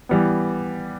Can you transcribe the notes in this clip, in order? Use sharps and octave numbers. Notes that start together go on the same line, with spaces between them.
E3 G3 B3